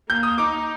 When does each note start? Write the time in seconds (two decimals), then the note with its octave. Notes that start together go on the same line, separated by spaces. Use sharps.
0.09 A#3 G6
0.23 D#6
0.38 D#4 D6